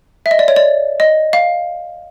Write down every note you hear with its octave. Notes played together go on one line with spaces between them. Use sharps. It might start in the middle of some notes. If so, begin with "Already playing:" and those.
E5
D#5
D5
C#5
D5
D#5
F5